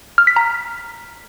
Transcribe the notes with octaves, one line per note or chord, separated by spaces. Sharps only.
F6
B6
A#5